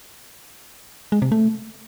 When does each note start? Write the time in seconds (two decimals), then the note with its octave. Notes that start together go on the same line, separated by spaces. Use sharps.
1.12 G#3
1.22 C3
1.32 A3